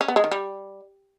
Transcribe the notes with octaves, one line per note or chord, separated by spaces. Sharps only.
C#4
B3
G#3
D#3
G3